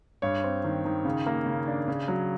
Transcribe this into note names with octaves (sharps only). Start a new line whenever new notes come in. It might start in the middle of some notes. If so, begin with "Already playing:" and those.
G2 C#5
C4
D#3
D#3
C#3
A#3
C#3
D4
C#3
F#3